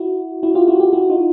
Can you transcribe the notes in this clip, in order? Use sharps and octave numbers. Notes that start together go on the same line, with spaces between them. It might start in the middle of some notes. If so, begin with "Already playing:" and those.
Already playing: E4 F#4
E4 F#4
F4 G4
E4 F#4
F4 G4
E4 F#4
D#4 F4